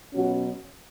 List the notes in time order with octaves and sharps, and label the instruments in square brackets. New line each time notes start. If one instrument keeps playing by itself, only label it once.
[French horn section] B2 F#3 C#4 F#4